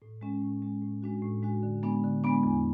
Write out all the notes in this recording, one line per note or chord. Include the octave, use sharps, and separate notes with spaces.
A2
G#3 C#4
A2
G#3 C#4
A2
G#3 D4 F#4
A2
G#3 D4 F#4
D3
G#3 B3 D4
D3
G#3 B3 D4
E2